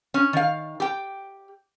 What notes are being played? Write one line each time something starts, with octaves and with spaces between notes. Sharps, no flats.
C#4
D#3 F5
G4 G5